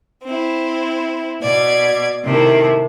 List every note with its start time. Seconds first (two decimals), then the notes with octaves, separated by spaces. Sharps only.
0.23 C4 E4
1.42 B2 D5 G#6
2.24 C3 D#3 A3 E4